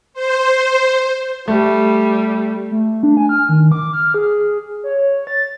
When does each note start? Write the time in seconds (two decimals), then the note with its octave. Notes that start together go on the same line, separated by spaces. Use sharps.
0.13 C5
1.48 G3 A3
2.72 A3
3.03 D4
3.17 G#5
3.29 F6
3.49 D#3
3.72 D6
3.93 F6
4.14 G#4
4.84 C#5
5.27 A6